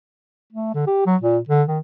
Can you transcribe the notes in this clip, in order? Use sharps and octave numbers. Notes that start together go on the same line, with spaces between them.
A3
D3
G4
F#3
A#2
D3
D#3